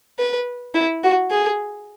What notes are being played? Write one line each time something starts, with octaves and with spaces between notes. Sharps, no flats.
B4
E4
F#4
G#4